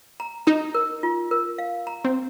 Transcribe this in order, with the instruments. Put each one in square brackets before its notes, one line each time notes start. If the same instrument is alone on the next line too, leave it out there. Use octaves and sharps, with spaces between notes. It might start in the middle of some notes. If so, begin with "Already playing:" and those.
[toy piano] A#5
[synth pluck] D#4 [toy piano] A#5
[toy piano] A#4
F4
A#4
F5
A#5
[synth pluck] C4